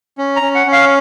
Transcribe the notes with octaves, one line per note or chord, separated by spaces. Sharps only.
C#4
A#5
C#4
F#5
C#4
F5